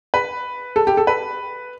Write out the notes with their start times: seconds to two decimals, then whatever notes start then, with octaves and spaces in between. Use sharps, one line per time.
0.14 B4
0.76 A4
0.87 G4
0.97 A4
1.07 B4